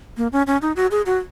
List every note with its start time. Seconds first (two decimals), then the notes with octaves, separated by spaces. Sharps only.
0.17 A#3
0.32 C#4
0.47 C#4
0.62 D#4
0.76 F#4
0.91 G#4
1.06 F#4